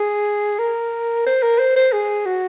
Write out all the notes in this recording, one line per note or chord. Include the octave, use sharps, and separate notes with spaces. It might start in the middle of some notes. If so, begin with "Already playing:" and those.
Already playing: G#4
A#4
C5
A#4
C5
C5
G#4
F#4